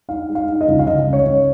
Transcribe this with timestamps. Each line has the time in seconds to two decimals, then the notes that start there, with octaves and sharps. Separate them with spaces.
0.08 D#4 F5
0.29 G#3
0.35 F5
0.48 D#4
0.61 D#5
0.68 C#2
0.79 F5
0.87 C#2 D#5
1.07 C#3
1.13 C#5
1.26 C#3